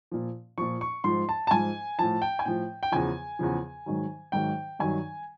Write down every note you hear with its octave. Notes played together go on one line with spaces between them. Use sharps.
A#2 F3
A#2 F3 C#6
C#6
G#2 F3 C6
A5
A5
G#2 F3 G#5
A2 F3 A5
G5
G#5
A2 F3 G5
G5
E2 C#3 F3 G#5
E2 C#3 F3
G#2 D#3 F#3
G#2 D#3 F#3 G5
G2 D#3 F#3 G#5